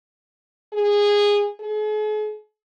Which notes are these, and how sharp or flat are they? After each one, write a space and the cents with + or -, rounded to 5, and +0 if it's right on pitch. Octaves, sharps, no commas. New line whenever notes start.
G#4 -15
G#4 +45